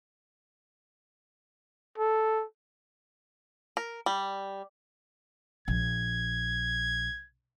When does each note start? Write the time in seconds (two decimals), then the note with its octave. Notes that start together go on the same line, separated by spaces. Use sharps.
1.98 A4
3.77 A#4
4.06 G3
5.68 A#1 G#6